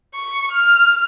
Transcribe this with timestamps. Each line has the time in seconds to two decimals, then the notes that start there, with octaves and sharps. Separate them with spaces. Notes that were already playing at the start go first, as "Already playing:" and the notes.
0.15 C#6
0.52 F6